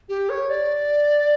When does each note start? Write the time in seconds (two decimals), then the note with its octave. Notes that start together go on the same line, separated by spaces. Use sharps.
0.09 G4
0.29 C#5
0.49 D5